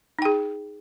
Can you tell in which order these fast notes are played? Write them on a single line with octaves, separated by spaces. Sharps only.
D#4 G5 G#4